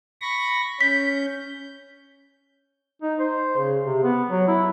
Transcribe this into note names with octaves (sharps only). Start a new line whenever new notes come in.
B5 C#6 A#6
C#4 G6 B6
D#4
C5
C#3
C3
B3
F#3
E4